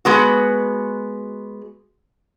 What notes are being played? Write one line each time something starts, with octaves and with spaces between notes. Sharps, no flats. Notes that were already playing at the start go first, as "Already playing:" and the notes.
G#3 B3 F#4